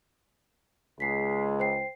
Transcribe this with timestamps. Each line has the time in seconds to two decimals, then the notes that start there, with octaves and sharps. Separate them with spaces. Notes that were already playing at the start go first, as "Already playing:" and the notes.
1.00 C#2 G#3 B6 C7
1.60 C5 G5 C7